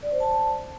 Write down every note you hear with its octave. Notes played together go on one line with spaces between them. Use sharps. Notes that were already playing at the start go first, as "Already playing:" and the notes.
D5
C5
A5